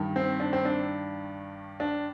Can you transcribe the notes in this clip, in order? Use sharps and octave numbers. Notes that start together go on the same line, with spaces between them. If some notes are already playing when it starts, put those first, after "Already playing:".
Already playing: G2 D#3
C4
D4
C4
D4
D4